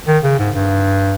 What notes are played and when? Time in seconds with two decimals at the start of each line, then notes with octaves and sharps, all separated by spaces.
0.08 D#3
0.24 C#3
0.39 G#2
0.55 G2